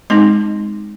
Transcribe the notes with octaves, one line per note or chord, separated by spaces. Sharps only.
G#3 C4 D#4 C6